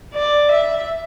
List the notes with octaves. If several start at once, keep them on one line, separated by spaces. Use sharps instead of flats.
D5
E5